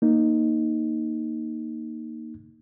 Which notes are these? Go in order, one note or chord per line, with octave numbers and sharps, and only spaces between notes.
A#3 D#4